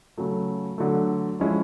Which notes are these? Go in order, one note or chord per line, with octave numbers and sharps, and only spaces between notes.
C#3 F#3 A3
D3 F#3 A3
F3 G#3 C#4 E4